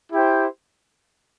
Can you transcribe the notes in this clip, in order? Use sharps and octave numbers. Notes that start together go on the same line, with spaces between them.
E4 G4 C5 G5